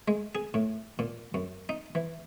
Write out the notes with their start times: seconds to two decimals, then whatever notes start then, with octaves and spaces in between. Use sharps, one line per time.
0.08 G#3
0.35 G#4
0.54 A2
0.99 A#2
1.34 F#2
1.69 D#4
1.95 E3